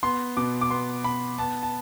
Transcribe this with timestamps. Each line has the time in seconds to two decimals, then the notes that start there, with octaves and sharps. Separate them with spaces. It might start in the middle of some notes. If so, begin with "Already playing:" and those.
0.03 B3 C6
0.37 B2 D6
0.61 D6
0.71 B3 C6
1.04 B3 B5
1.38 B3 A5
1.63 A5